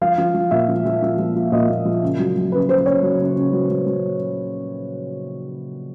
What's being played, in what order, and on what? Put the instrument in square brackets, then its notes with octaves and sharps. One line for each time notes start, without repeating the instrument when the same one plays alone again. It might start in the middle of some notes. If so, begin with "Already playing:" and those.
[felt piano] F3 F5
F3
F3
A#2 E5
F3
F3
F3
F3
F3
A#2 D#5
A#2
F3
C#3
F#3
F#3
C#3 B4
C#3 C5
C5
C#3 C#5
F#3
C#3
C#3
F#3
F#3
F#3